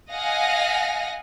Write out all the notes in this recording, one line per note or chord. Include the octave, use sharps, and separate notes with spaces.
D#5 F5 F#5 G#5 A#6